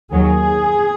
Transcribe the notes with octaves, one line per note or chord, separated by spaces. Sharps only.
D#2 D#3 F#3 G#4